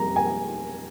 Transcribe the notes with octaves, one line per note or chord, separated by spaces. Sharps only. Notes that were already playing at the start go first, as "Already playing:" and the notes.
Already playing: F2 G3 A#5
G#5